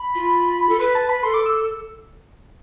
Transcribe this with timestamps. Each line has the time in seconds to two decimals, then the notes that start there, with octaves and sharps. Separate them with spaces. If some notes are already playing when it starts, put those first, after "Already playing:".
Already playing: B5
0.15 F4
0.69 A4
0.79 B4 B5
0.95 A5
1.09 B5
1.23 A4 C6
1.34 D6
1.46 E6